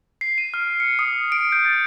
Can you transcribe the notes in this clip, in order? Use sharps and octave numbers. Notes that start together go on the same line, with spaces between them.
C7
D#7
F6
C#7
D#6
D7
G6
A6